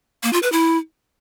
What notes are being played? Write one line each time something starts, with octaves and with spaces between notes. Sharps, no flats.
A#3
F4
B4
E4